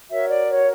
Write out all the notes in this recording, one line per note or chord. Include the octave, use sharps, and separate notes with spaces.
F#4 A#4 C#5 E5
D5
C#5